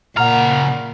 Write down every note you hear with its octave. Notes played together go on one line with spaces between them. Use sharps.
A#2 C#3 F#5 A#5 F6